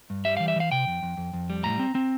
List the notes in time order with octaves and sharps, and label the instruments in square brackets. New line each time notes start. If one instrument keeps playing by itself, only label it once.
[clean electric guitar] G2
G3 E5
E3 F5
E5
E3 F5
C3 G5
F2
F2
F2
F2
G3
A2 A#5
C4
C4